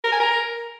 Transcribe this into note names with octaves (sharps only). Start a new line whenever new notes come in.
A#4
G#5
A#4